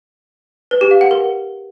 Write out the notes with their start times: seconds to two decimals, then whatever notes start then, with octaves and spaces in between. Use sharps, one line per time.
0.71 B4
0.81 G4
0.91 F5
1.01 F#5
1.11 A#4